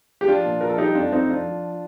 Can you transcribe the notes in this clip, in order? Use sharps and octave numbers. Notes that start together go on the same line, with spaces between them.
G4
F3 D4 F4
A#2
F3 A#4
A4
G3 D#4 G4
F2 D4 F4
F2 C4 D#4
F3 D4 F4
F3